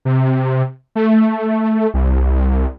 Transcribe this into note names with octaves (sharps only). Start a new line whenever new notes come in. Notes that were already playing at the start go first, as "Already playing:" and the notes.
C3
A3
C2